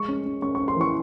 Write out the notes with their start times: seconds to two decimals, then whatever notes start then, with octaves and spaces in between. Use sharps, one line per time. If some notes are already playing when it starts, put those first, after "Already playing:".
Already playing: G#3 C#6
0.08 C#4
0.25 C#4
0.42 C#4 C#6
0.55 C#4 C#6
0.68 C6
0.76 E3 C#6